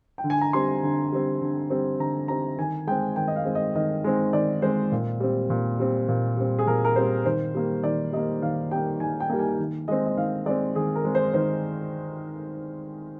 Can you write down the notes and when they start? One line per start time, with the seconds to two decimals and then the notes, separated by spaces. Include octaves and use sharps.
0.18 G5
0.24 D3
0.30 G#5
0.41 A#5
0.53 G3 C4 C6
0.83 D3
1.12 G3 C4
1.41 D3
1.70 G3 C4
1.99 D3 A#5
2.28 G3 C4 A#5
2.58 D#3 G#5
2.87 G#3 C4 G5
3.16 D#3 G5
3.28 D#5
3.36 F5
3.45 G#3 C4
3.55 D#5
3.75 D#3 D#5
4.04 G#3 C4
4.33 D#3 D5
4.62 G#3 C5
4.66 C4
4.92 A#2
5.20 G3 C4
5.50 A#2
5.79 G3 C4
6.08 A#2
6.37 G3 C4
6.59 G#4
6.67 A#2 A#4
6.85 A#4
6.96 G3 C4 C5
7.25 D#3 C5
7.55 G3 A#3
7.84 D#3 D5
8.12 G3 A#3 D#5
8.42 D#3 F5
8.71 G3 A#3 G5
9.00 D#3 G#5
9.20 G5
9.30 G3 A#3
9.39 G#5
9.58 D#3
9.88 G#3 C4 D#5
10.06 D#5
10.17 D#3 F5
10.46 G#3 C4 D5
10.75 D#3 G#4
10.95 A#4
11.04 G#3 C4
11.15 C5
11.34 D#3 C5